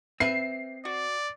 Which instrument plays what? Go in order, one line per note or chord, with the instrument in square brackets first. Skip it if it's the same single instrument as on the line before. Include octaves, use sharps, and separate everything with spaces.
[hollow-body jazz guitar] C4 [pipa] B4 E5 [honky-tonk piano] C7
[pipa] F#4 [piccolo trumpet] D5